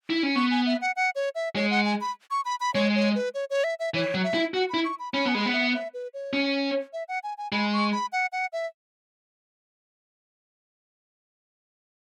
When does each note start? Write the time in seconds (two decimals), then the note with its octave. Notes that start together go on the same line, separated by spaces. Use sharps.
0.10 E4
0.23 C#4
0.35 B3 C#6
0.51 G#5
0.66 E5
0.81 F#5
0.96 F#5
1.15 C#5
1.35 E5
1.55 G#3 C#5
1.70 F#5
1.85 G#5
2.01 B5
2.31 C#6
2.45 B5
2.60 B5
2.74 G#3 C#5
2.95 C#5
3.15 B4
3.34 C#5
3.50 C#5
3.64 E5
3.79 E5
3.94 E3 C#5
4.14 F#3
4.24 E5
4.34 E4
4.54 F#4 F#5
4.70 E4 B5
4.85 C#6
4.99 B5
5.13 C#4 B5
5.25 B3 G#5
5.34 G#3 B5
5.46 B3
5.53 E5
5.74 E5
5.94 B4
6.14 C#5
6.33 C#4
6.93 E5
7.09 F#5
7.23 G#5
7.38 G#5
7.52 G#3 B5
7.73 C#6
7.92 B5
8.12 F#5
8.32 F#5
8.53 E5